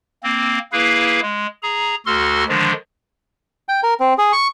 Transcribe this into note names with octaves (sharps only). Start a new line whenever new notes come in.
A#3 C4
A#3 E4 G#4 B4 F5
G#3
G#4 A#5
D2 F#4 A4 C6 F6
D3 D#3 F3 G#3 D4
G5
A#4
C4
G#4
C#6